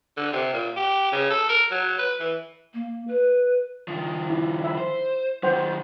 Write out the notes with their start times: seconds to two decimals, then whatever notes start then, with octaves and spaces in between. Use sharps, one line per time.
0.17 D3
0.32 C3
0.53 A#2
0.76 G4
1.12 C#3
1.30 A4
1.49 A#4
1.71 F#3
1.99 B4
2.20 E3
2.74 A#3
3.08 B4
3.88 D#3 F3
4.30 E4
4.64 E5 B5
4.78 C5
5.43 D#3 F#3 C5 F#5 G5